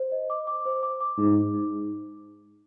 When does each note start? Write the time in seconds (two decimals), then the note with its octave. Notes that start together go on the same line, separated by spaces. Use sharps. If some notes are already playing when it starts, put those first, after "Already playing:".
Already playing: C5
0.12 D#5
0.30 D6
0.47 D6
0.65 C5
0.83 D6
1.01 D6
1.18 G#2 D#4
1.36 D#4
1.54 D#4